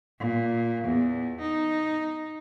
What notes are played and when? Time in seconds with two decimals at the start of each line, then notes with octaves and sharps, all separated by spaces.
0.19 A#2
0.84 E2
1.41 D#4